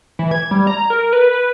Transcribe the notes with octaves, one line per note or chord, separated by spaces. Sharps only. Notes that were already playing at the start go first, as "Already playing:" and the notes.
E3
G#6
G3
A#5
A#4
B4
B4